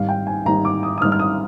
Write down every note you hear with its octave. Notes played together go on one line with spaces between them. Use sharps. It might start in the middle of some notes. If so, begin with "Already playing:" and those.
Already playing: G#1 G#2 G3 F5
G5
G#5
G#1 G#2 G3 A#5
D6
D#6
D#6
G#1 G#2 G3 F6
F6
D#6